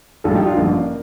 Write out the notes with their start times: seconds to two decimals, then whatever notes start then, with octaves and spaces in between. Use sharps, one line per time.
0.24 A#1 A2 G3 F4 A4
0.35 D#4 G4
0.46 D4 F4
0.57 A1 G2 D3 F3 A#3